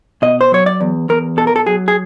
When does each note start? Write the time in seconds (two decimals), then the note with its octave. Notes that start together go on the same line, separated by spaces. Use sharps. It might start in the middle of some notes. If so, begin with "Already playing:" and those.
0.22 B2 D#5
0.41 C5
0.52 F#3 C#5
0.66 D5
0.81 E2
1.09 E2 A#4
1.37 B2 A4
1.47 A#4
1.56 A4
1.66 F#3 G#4
1.88 G#4